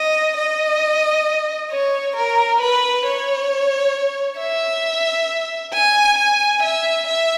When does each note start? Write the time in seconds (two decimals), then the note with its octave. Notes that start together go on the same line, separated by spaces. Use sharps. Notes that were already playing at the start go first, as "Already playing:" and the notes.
Already playing: D#5
0.37 D#5
1.72 C#5
2.17 A#4
2.61 B4
3.06 C#5
4.39 E5
5.73 G#5
6.18 G#5
6.63 E5
7.07 E5